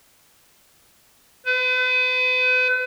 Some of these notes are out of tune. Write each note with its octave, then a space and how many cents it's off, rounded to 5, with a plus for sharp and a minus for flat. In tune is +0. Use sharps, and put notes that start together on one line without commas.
B4 +40